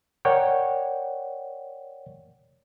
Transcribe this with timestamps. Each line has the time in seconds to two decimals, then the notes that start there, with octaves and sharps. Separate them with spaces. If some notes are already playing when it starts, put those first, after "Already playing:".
0.25 A#4 C#5 D5 F#5 G5